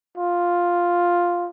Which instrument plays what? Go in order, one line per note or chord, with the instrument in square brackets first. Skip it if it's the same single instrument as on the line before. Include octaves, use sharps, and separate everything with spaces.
[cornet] F4